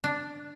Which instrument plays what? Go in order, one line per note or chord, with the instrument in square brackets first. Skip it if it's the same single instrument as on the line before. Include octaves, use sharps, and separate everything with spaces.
[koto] D4